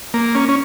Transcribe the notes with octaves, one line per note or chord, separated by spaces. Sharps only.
A#3
C#4
C#4